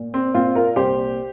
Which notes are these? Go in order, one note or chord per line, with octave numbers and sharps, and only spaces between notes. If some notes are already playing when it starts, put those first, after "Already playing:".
Already playing: A#2
C4
A#2 C4 F4
F4 A#4
C2 G4 C5